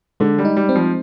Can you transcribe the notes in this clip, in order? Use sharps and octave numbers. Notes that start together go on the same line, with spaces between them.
D3 G#3
G3
D#4
G3
C4
F3